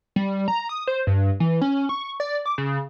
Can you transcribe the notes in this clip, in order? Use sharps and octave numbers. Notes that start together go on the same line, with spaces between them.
G3
A#5
D#6
C5
G2
E3
C#4
C#6
D5
D6
C#3